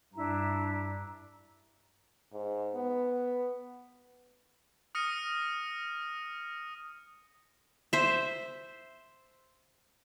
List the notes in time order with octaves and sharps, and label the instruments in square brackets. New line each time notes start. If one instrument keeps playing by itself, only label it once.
[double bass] G2 [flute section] D4 E4 [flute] A#5
[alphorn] G#2
B3
[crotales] D#6 F6 A#6 C#7 D#7
[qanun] C5 E5